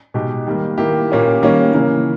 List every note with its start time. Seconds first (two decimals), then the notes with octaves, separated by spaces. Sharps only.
0.14 B2 G#3 D#4 G4
0.47 D#3 G3 A#3
0.78 D#3 A#3 E4 G4
1.10 A#2 A#3 C#4 G4
1.42 D#3 G3 A#3 C#4
1.73 C#3 E3 A#3